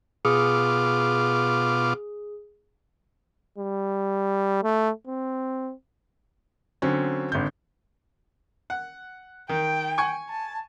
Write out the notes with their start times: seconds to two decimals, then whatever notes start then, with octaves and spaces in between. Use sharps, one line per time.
0.25 B2 F4 G#4 D6
3.58 G3
4.64 A3
5.07 C4
6.82 D3 F#3 C4 C#4
7.32 G#1 D3 G6
8.70 F#5
9.49 D#3 G5
9.98 G#5 C#6
10.29 A5